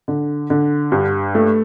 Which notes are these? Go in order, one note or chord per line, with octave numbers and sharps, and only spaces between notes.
D3
D3
G2
A3